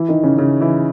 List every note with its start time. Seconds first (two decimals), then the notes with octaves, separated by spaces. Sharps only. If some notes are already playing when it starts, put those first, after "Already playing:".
Already playing: E3 E4
0.09 D#3 D#4
0.23 C#3 C#4
0.38 C#3 C#4
0.61 E3 E4